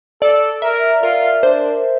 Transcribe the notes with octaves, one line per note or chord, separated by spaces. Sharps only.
A4 D5
A#4 E5
F4 A#4
D4 C5